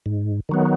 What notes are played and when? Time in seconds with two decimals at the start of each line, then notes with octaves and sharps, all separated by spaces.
0.06 G#2
0.49 D#3 F#3 B3